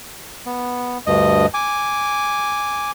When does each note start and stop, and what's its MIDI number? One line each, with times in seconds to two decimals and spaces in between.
0.46 0.98 59
1.07 1.46 38
1.07 1.46 43
1.07 1.46 75
1.54 2.91 80
1.54 2.91 86